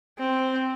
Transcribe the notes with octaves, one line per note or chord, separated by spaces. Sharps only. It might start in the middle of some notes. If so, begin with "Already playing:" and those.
C4